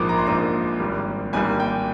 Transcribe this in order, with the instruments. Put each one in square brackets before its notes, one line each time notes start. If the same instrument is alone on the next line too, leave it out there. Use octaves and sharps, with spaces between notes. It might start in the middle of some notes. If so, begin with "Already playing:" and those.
Already playing: [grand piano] A#1 G#2 F3 A#3 D6
A#5
C6
A#1 G#2 F3 A#3 A#5
G#1 G#2 G3 A#3
G#1 G#2 G3 A#3 G#5
G5